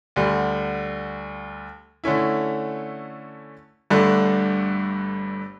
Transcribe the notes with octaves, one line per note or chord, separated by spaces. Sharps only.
D2 D3 G3
D3 A3 C#4 E4
G1 G2 D3 A3 D4